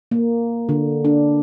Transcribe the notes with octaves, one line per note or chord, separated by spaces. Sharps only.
A#3
D3
D4